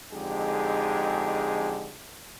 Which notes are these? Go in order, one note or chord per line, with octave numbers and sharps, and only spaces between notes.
F2 D3 G#3 D#4 G4 G#4